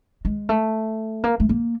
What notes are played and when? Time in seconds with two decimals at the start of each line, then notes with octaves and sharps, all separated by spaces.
0.25 G#3
0.49 A3
1.24 A#3
1.40 A3
1.49 A#3